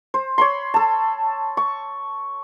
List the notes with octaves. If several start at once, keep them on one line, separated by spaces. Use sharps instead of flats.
C5
C#5 B5 C6
A4 A5
C#6